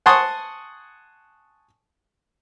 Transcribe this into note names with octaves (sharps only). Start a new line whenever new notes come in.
F#5 G#5 A5 C6 C#6 D#6